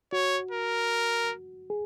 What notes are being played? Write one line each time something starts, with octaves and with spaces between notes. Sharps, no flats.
F#4 C#5
A#4
G#4